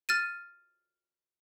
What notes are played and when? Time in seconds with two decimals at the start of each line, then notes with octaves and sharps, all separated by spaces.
0.09 F6 A6 D#7